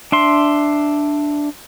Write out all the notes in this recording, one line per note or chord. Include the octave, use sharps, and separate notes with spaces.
D4 E5 C6